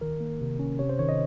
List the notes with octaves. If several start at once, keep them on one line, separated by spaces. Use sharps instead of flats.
D#3 A#4
A#3
C3
C#4
C3 C#5
C5
D#3 C#5
D#5